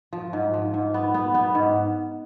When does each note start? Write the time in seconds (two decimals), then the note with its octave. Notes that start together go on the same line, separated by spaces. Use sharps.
0.13 F3
0.33 G#2
0.54 F3
0.74 G#2
0.94 B3
1.14 B3
1.35 B3
1.55 G#2